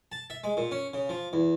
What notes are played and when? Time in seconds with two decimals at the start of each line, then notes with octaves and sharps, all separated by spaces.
0.12 A5
0.30 E5
0.44 G#3
0.57 A#2
0.71 C#4
0.93 C#3
1.09 F3
1.33 E2